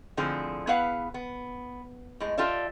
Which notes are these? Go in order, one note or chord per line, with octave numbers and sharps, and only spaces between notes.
A2 D3 F3 C4 G#4
B3 E4 G#4 B4 F5 F#5
B3
A2 G#3
F4 G4 A4 D5 E5